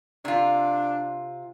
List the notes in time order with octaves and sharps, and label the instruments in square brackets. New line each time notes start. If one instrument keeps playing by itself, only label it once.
[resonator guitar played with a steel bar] C3 F4 [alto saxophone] D4